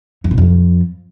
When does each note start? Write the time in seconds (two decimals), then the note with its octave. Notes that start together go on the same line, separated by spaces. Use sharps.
0.24 F2
0.31 B2
0.38 F2